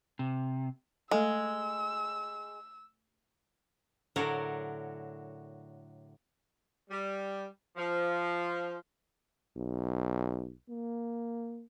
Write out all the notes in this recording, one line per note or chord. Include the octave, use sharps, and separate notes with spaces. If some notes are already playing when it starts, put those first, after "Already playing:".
C3
G#3 A3 A4 E6
A2 D3 F#3 A#4
G3
F3
B1
A#3